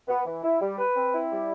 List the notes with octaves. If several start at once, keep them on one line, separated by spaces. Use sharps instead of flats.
B3
E3
E4
G3
B4
C4
E4
G3